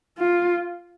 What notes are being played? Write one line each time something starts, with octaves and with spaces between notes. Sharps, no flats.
F4